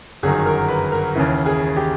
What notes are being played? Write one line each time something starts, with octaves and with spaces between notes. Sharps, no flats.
G1 F#2 D#3 G#4
A#4
B4
A#4
D#2 C#3 E3
G#4
G4